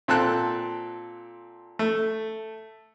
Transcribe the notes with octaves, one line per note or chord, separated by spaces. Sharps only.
A#2 C4 A4 A5 F#6
A3